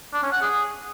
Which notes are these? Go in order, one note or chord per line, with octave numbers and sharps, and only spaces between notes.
D4
C#4
F#5
G#4